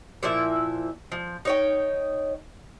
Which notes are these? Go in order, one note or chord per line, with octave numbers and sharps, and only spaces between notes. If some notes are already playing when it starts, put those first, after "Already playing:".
A#2 F3 E4 E5
F3
D#4 C#5 G5